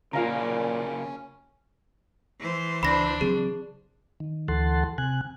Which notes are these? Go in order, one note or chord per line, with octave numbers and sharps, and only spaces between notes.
A#2 C#3 A#3 C#4 F4 F5 A#5
E3 C5
C#2 D4 B5 A#6
C#3 F#3 C4 G#4
D#3
D2 E3 A4 F#5 A5 C6
C3 G#5 F#6